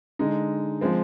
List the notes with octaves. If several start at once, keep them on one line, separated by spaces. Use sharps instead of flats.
D3 G#3 D#4
F3 G#3 C4